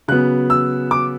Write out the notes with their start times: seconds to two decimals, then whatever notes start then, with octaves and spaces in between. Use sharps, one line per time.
0.08 C#3 F#3 B3 F#6
0.50 E6
0.91 D6